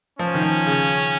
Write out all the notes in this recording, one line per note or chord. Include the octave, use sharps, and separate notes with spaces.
F3 C#4
D#3
F3
C#3